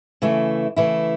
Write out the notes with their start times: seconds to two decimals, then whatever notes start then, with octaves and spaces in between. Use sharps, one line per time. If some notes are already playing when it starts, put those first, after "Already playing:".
0.22 C#3 E3 A3 E4
0.76 C#3 E3 A3 E4